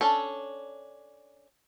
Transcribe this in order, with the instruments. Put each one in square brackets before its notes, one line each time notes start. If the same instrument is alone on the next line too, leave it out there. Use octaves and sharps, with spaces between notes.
[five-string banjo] C#4 D4 A4